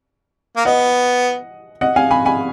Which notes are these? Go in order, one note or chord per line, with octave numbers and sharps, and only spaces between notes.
A#3
B3 D#5 F#5
D#5 F#5
F5 G#5
G#5 B5
G#5 B5